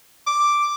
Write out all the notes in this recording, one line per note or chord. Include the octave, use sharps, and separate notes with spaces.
D6